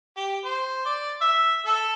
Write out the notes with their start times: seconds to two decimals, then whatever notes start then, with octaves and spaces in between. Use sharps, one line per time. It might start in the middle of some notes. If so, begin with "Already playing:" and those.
0.17 G4
0.45 C5
0.86 D5
1.21 E5
1.66 A4